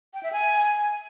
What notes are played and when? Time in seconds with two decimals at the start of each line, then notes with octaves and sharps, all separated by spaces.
0.14 G5
0.23 E5
0.32 G#5